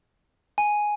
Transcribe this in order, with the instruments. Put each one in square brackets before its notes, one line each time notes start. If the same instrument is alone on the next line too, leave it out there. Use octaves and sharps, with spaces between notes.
[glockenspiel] G#5